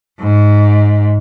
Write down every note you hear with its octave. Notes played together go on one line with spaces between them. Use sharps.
G#2